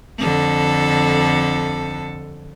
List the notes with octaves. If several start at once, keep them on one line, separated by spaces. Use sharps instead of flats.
F2 D3 A4